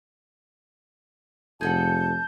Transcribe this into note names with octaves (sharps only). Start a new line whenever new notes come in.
F1 G#4 A4 F#5 A5 G6